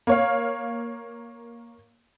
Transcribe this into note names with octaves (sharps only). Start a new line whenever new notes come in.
A#3 C#5 F5